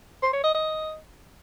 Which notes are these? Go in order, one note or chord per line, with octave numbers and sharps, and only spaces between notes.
C5
C#5
D#5
D#5